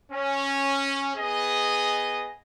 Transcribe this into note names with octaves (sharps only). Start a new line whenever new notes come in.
C#4
B3 G#4 D#5